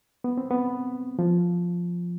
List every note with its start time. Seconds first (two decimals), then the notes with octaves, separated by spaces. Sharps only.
0.24 B3
0.37 C4
0.51 B3
1.19 F3